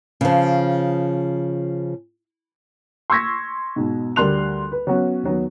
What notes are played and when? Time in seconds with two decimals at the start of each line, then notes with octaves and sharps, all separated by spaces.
0.21 C#3 F3
3.10 C6 C#6 E6 G#6 A#6 B6
3.76 G#2 B2
4.16 D2 G3 A#4 C6 F#6 F7
4.72 B4
4.87 F#3 B3 C#4 F#4
5.23 D#2 F#3 B3